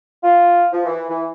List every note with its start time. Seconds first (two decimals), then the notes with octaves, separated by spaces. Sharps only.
0.24 F4
0.72 F3
0.86 E3
1.08 E3